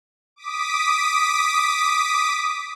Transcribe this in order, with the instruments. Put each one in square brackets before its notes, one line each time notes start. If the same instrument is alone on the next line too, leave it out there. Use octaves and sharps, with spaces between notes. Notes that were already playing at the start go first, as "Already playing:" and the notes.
[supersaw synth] D6 D#6 B6